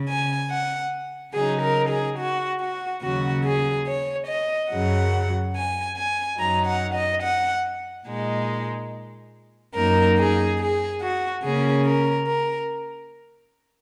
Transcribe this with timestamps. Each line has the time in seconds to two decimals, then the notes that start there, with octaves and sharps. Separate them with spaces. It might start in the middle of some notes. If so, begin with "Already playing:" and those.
Already playing: C#3
0.08 G#5
0.51 F#5
1.34 C#3 F#3 D#4 G#4
1.62 A#4
1.90 G#4
2.19 F#4
2.61 F#4
3.02 D#2 C#3 F#3 F#4
3.45 G#4
3.87 C#5
4.28 D#5
4.70 F#2 C#3 F#3 F#5
5.55 G#5
5.97 G#5
6.38 F#2 F#3 D#4 A#5
6.67 F#5
6.95 D#5
7.23 F#5
8.07 A#2 G#3 D#4
9.75 F#2 F#3 A#3 D#4 A#4
10.18 G#4
10.59 G#4
11.01 F#4
11.43 C#3 A#3 C#4 G#4
11.86 A#4
12.28 A#4